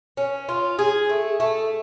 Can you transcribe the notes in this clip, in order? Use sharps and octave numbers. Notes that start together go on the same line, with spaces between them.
C#4
F4
G#4
A3
A3